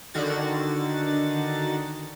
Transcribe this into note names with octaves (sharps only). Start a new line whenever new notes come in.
D3 D#3 F#4 A6